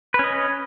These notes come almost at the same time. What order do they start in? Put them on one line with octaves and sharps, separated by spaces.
B4 C#4 D#5